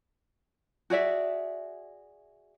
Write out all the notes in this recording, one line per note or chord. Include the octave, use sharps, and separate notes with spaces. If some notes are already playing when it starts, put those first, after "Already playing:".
F#4 G#4 D5 E5